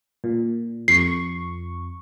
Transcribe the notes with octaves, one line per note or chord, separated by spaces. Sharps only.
A#2
F2 C#6 C7